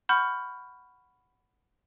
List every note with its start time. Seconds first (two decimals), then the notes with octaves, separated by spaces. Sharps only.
0.09 F#5 B5 C#6 F6 G6